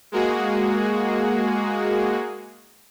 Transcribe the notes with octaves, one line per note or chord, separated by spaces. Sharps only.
G#3 A#3 F#4 G#4